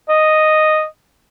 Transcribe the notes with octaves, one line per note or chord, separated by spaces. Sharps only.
D#5